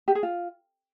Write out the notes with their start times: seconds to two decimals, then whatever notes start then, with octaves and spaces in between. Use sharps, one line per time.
0.08 G4
0.15 G#4
0.23 F4